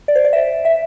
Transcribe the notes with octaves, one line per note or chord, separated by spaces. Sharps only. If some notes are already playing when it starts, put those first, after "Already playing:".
D5
C5
D5
E5
E5